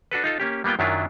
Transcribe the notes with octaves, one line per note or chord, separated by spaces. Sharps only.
D4 F#4 A4 B4
D#4 F4 A4
A#3 C#4 G4
G3 A#3 B3 F4 G5
F#2 D#3 F#3 D4 E4 F4